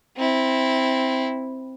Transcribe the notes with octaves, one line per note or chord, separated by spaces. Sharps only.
C4 E4